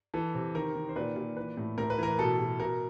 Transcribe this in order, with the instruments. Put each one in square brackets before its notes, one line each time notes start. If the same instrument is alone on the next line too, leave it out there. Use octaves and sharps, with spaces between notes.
[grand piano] E3 A4
C3
D#3 A#4
D#3
C5
A#2 B4
A#2
E3 B4
A2
A2 A#4
B4
E3 A#4
B2 A4
B2
B2 A#4